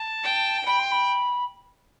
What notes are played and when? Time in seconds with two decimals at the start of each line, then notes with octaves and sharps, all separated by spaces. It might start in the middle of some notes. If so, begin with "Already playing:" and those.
Already playing: A5
0.24 G5
0.66 G5 B5
0.79 C6
0.91 B5